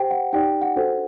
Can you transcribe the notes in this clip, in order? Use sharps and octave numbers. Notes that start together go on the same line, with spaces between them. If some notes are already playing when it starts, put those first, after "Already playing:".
Already playing: G4 C5 G5
F#5
D#4 G4 D5 G5
F#5
D4 F#4 A4 C5